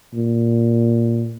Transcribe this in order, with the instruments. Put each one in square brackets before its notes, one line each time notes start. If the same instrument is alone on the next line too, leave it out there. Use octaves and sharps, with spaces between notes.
[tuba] A#2